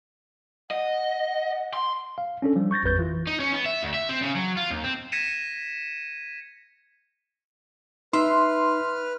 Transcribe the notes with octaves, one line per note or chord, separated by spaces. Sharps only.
D#5 F#5
C6
F5
C#4 D4 A4
F3 G3
C#6 G6 A6 A#6
A1 F2 B4 G6 A6
E3 F4
D#4
C#4
B3
E5
D2
E5
C4
C#3
F#3
F4
D#2
C4
G#6 A#6 B6 C#7 D#7 E7
D#4 B4 E5 C6 F6